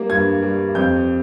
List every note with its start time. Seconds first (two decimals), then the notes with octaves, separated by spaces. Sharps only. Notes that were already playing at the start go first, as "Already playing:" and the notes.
Already playing: G3 A#3
0.09 G2 G#6
0.42 G3
0.75 F2 G6